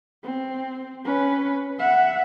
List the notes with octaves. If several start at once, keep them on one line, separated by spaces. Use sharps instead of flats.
C4
C#4 B4
E5 F#5